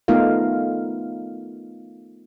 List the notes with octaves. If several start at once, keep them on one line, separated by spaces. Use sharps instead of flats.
A3 B3 D#4 F4 A#4 F5